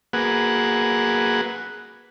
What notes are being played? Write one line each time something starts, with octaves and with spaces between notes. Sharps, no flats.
A#3 F#4 G#4 B4 F#5